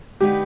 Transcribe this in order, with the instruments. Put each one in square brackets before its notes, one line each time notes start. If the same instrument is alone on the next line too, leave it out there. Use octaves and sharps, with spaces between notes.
[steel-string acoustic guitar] D3 G#3 B3 D#4 B4 [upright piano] G4